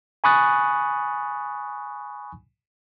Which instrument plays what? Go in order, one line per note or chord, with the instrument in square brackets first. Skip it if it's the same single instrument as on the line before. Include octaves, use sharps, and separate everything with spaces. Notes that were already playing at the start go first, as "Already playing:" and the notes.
[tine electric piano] G#5 B5 C#6 D#6 F#6 A6